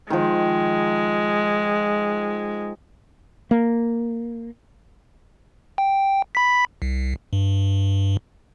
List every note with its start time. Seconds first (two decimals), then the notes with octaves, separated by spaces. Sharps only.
0.10 D#3 F3 G#3
3.51 A#3
5.78 G5
6.35 B5 B6
6.82 C2
7.33 G2